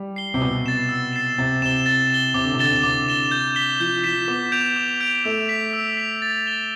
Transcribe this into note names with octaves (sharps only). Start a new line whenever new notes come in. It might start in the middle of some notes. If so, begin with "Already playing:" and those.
Already playing: G3
C7 G7
C3
B2 E6
A6 C7 E7
E6
A6 C7 E7
C3 A6
C3 E7 G7
A6
E7 G7
C3 D6
D3
C3
D3 A6 E7 G7
C3
C3 D6
A6 E7 G7
G6
B6 E7 G7
F3 G6
F3 B6 E7 G7
B3 D6
G6 D7 F7
D6
G6 D7 F7
A3 E6
B6 F7
E6
B6 F7
A6
E7 G7